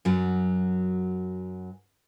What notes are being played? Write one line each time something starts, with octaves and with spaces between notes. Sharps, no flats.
F#2 F#3